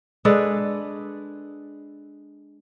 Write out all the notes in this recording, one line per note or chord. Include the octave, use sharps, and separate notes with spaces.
G#3 D4 A4 B4